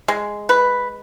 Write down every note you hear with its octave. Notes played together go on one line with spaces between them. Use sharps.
G#3
B4